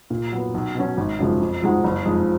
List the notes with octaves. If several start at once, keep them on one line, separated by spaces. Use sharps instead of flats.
A#2
F#3 B3
B1
B2 F#3 C#4
G#1
F#2 C#3 F3 G#3
F2
F3 G#3 D#4 F#4
F#1
F2 F3 G#3 D#4